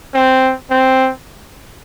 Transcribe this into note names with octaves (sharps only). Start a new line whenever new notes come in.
C4
C4